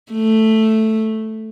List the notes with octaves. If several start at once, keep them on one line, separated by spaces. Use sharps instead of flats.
A3